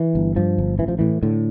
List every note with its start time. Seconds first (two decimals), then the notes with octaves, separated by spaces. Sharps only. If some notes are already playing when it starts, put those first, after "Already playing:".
Already playing: E3
0.15 G1
0.36 G2 F3
0.58 G1
0.79 A1 E3
0.88 F3
0.99 A2 E3
1.23 A2 D3